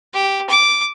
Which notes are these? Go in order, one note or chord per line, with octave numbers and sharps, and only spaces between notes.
G4
D6